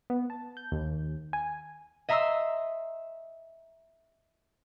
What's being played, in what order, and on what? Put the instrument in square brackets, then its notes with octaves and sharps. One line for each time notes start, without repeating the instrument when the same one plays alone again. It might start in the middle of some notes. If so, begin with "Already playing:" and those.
[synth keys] B3
A5
G6
D#2
G#5
[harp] D#5 E5 A#5 C6 E6